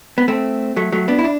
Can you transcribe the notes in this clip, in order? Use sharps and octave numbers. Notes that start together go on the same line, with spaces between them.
B3
A3 C4
F#3 A3
F#3 A3
B3 D4
E4
D4